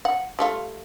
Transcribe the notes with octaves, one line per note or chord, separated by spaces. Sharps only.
F#5
G3 A3 F4